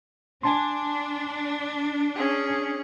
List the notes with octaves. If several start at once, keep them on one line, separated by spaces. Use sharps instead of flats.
D4 G#5 A5 C6
C#4 G#4